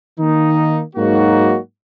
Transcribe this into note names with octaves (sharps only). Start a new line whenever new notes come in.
D#3 A#3 D#4
G#2 F#3 A#3 D#4 F#4